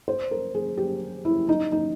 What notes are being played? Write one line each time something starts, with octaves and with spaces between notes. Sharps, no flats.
C5
A#4
G#4
G4
E4
D#4
D#4